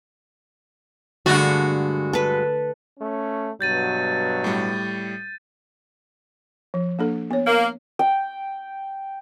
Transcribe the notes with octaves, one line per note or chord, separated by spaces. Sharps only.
G2 D3 G#3 A3 F#4
A4 B4
A3 C#4
G2 B2 F#3 G6 A6 D#7
A2 G3
F3
A#3 D4 A4
B3 C#5
A#3
G5